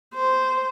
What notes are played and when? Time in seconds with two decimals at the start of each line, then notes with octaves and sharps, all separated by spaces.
0.15 C5